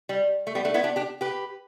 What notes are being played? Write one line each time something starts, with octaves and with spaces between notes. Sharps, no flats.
G3
A3
G3 B3
A3 D4
B3 E4
D4 G4
D4 G4
G4 B4